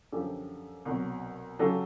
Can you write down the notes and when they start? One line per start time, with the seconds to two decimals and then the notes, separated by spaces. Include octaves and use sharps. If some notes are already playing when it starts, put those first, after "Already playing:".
0.12 F#2 D3 F3 G4 A4
0.85 C2 B2 F#3
1.59 C#3 F#3 G4 A4